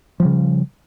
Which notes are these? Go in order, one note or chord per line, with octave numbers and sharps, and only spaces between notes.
C#3 F3 G3